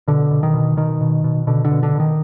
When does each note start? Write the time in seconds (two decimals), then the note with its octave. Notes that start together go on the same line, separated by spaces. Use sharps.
0.08 B2 D3
0.31 B2
0.43 D#3
0.54 B2
0.77 B2 D#3
1.01 B2
1.24 B2
1.47 B2 D3
1.65 D3
1.71 B2
1.83 D3
1.95 B2 D#3